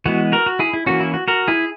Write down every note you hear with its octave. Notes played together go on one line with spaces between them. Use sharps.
E3 G#3 B3 F#4
F#4 A#4
F#4
E4 G#4
E4
E3 A#3 C#4 F#4
E4
F#4
F#4 A#4
E4 G#4